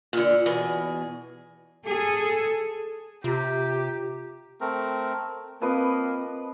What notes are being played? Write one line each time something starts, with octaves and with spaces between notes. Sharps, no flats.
A#2 D3
E2 B2 G#4
G#4 A4
C3 F4 G4 A#5
A3 C4 A#4
F3 A#3 C4 B4 D#5